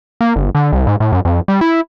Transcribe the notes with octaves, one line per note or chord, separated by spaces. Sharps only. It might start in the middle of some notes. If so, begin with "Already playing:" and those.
A#3
G1
D3
C2
G#2
A2
F#2
F2
G3
E4